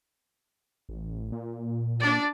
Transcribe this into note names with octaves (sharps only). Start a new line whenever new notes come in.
A1
A#2
D4 D5